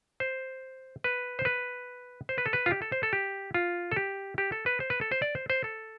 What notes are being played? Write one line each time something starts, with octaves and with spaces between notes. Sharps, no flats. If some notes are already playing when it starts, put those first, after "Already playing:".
C5
B4
C5
B4
C5
B4
A4
B4
F4
G4
A4
C5
A4
G4
F4
A4
G4
G4
A4
B4
C5
B4
A4
C5
D5
C5
C5
A4